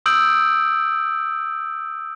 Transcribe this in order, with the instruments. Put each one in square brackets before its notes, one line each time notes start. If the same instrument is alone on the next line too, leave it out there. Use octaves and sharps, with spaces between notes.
[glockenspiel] D#6 E6 G6 D7 F#7